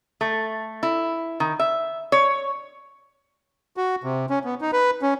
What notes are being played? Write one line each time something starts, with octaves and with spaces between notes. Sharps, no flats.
A3
E4
D#3
E5
C#5
F#4
C3
C#4
B3
D#4
B4
C#4